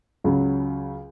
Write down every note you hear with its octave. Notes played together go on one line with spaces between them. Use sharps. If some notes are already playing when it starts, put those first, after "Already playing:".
C#2 C#3 F#3